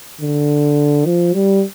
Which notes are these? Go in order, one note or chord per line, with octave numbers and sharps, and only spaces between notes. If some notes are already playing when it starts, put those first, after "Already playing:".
D3
F3
G3